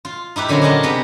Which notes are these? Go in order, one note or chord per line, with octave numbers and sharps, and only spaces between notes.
F4
D#4 E4 G4 B4
A#2 D3 F#3 C#4 A#4 C5
D4 F#4 G#4 A#4 D#5 A5
C3 B3 G4 G#4 B4 A#5